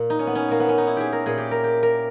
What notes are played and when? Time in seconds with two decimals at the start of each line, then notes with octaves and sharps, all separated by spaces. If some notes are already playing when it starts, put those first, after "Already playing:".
Already playing: A#2
0.10 D#4
0.19 C#4
0.27 B3
0.35 C#4
0.49 A#2 A#3
0.60 B3
0.68 C#4
0.78 D#4
0.87 E4
0.96 G4 G#4
1.12 A#4
1.26 A#2 G#4
1.38 G4
1.51 A#4
1.64 G4
1.83 A#4